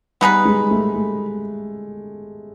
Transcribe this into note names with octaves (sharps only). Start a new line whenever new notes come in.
G3 B3 D#4 G#4 B4
G#3
A3
A3